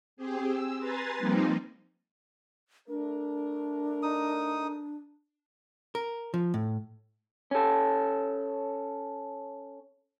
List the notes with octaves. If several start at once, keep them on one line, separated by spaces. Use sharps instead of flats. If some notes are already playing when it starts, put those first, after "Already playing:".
C4 G4 G#4
E6
B4 G#5 A#5 C6 A6
F3 G3 A#3 C4 D#4
A3 D4 A#4
D#4 D#6
A#4
F3
A2
C#4 A4